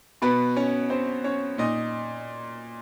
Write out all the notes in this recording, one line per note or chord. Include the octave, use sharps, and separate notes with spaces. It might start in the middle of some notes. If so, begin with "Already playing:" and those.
B2 B3 B4
C#4 C#5
C4 C5
C#4 C#5
A#2 D#4 D#5